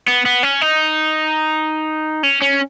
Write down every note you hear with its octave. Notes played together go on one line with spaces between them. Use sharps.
B3
B3
C#4
D#4
C#4
C#4